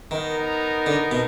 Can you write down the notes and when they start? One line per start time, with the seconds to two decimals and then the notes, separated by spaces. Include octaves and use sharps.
0.11 D#3 B3 D#4 A#4
0.86 D3
1.11 B2